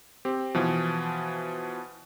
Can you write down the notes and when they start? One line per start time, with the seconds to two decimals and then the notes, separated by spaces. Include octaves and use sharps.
0.25 C4 G4
0.54 B2 E3 F3